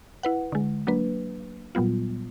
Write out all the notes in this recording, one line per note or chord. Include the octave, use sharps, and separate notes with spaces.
E4 B4 F#5
D3 G#3
F#3 A#3 D4 B4
A#2 F#3 G3 B3 F4